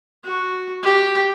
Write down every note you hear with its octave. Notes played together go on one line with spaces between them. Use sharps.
F#4
G4